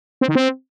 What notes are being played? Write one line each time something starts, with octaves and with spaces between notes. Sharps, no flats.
C4
D#3
C4